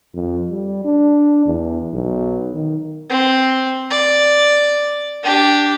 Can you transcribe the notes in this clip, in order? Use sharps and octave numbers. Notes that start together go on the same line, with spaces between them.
F2
G3
D4
E2
B1
D#3
C4
D5
D4 G4